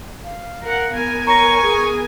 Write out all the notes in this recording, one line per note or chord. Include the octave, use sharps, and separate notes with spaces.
F5
A#4 F#5
B3 A#4 G#5
C#5 A#5 C#6 A#6
G#4